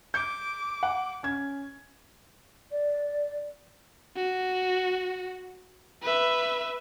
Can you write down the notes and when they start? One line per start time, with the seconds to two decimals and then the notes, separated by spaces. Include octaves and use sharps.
0.14 D6 G6
0.83 F#5
1.23 C#4 G#6
2.72 D5
4.16 F#4
6.02 B4 E5